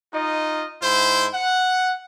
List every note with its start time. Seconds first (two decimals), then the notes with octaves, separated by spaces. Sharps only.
0.13 D#4 F4 D#5
0.82 G#2 E4 C5
1.34 F#5